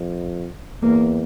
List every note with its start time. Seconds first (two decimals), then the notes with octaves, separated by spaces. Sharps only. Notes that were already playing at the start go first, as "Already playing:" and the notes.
Already playing: F2
0.82 E2 A#3